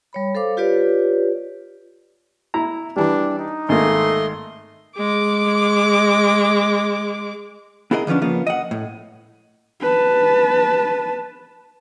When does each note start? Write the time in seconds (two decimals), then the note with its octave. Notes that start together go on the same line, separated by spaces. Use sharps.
0.13 G3 C#5 B5
0.35 A4 C5 F5 D6
0.57 F4 G4 B4 C#5 D5
2.54 E4 A#5
2.96 E3 G3 D4
3.39 D#4
3.69 G#1 A3 A#3 D#5 C6
4.97 G#3 D6
7.91 B3 E4 G#4 A#4 D#5
8.07 D3 F3 B3 C#4 D4
8.21 C#3 F3 A#3 B3
8.47 D#5 F#5
8.71 A2
9.82 B4 A5